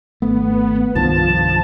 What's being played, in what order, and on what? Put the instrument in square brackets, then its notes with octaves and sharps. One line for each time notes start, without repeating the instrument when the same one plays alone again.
[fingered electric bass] G#1 A3 [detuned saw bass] B3
[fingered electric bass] C2 G2 D#3 [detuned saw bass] F3 [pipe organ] A5